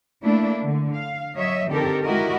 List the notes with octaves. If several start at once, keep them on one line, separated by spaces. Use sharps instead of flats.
A3 A#3 D4 E4
D3
F5
F#3 C#5 D#5 E5
D3 D#3 C4 G4 A4 A#4
G#3 E4 F#4 G4 A#4 D#5